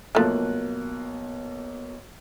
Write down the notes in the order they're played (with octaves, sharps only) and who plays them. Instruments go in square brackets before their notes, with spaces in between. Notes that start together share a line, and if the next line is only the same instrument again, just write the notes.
[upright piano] B1 A#3 F#6 [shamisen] F3 A3